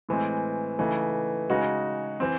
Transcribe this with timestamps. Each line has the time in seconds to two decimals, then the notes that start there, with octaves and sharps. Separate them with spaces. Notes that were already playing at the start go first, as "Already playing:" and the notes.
0.09 A2 E3 G#3 C4
0.79 C#3 E3 A3 D#4
1.50 C#3 G#3 D#4 F#4
2.20 E3 C4